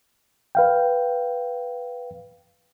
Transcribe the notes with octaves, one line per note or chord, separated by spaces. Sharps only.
B4 F5 G5